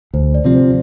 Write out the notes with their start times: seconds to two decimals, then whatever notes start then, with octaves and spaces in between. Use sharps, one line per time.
0.14 D2 C5
0.34 D5
0.45 C3 F3 C4
0.55 C5